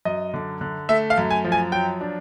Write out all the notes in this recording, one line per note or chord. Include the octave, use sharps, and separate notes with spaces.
F#2 D#5
D3
D3
A3 E5
F5
F#2
G#5
F3
G#5
F#3 G5
D4